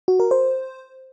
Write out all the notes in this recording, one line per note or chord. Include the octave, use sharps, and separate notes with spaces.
F#4
A#4
C5